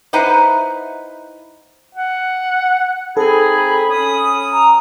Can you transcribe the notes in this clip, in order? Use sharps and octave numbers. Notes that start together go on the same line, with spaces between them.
D#4 E4 B4 C5 F#5 A#5
F#5
C4 D#4 G#4 A4 B5
C#4 D#6
A#5